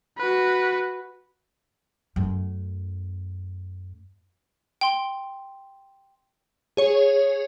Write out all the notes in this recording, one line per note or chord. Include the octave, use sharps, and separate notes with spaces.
F#4 B4
F#2 A3
G5 C6 D7
G#4 C#5